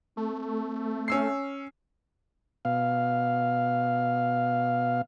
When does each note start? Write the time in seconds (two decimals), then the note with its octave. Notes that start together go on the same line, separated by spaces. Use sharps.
0.17 A3 C4
1.08 C#4 E6 C7
2.65 B2 F5